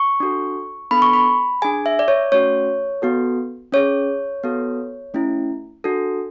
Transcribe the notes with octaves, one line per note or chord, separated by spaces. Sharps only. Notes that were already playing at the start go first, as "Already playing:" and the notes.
Already playing: C#6
D4 F#4 A4
B3 D4 A4 B5
C#6
B5
D4 G#4 G#5
E5
D5
C#5
A3 C#4 F#4 C#5
B3 F#4 A4
C#4 G#4 C#5
B3 F#4 A4
A3 C#4 E4
D4 F#4 A4